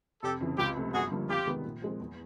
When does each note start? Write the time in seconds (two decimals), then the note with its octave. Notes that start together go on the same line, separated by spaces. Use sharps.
0.23 F1 G4 A4
0.41 F2 C#3 E3
0.58 C#2 F4 G4
0.76 C3 F3 A3
0.93 G1 F#4 G#4
1.11 G2 D3 F3 A#3
1.29 F2 F4 G4
1.47 C3 D#3 G#3 B3
1.64 A#2
1.82 F3 G#3 C4
2.00 E2